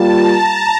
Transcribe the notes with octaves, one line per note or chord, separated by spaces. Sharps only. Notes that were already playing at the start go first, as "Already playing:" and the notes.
Already playing: G3 A#3 F4 A5
A#5